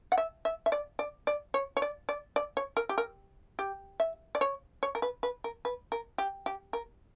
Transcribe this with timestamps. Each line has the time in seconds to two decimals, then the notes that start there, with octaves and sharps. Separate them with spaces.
0.12 F#5
0.18 E5
0.45 E5
0.66 E5
0.72 D5
0.99 D5
1.27 D5
1.54 C#5
1.77 C#5
1.82 D5
2.09 D5
2.36 D5
2.57 C#5
2.77 A#4
2.89 G4
2.98 A#4
3.59 G4
4.00 E5
4.35 D5
4.41 C#5
4.83 C#5
4.95 A#4
5.02 B4
5.23 B4
5.44 A#4
5.65 B4
5.92 A#4
6.18 G4
6.46 G4
6.73 A#4